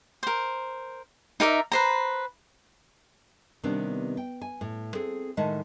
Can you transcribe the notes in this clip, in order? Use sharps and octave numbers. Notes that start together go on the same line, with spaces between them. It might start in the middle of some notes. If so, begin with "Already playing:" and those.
A#4 C5
D#4 A#4 D5 E5
B4 C5 A#5
C3 D#3 G3 B3 C4 D4
G5
G#5
A2
C4 G#4 A4
A2 D#3 G#3 E5 F#5 A5